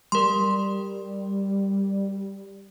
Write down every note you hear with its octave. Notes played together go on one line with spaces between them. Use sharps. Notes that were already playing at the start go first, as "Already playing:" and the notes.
G3 A#4 C6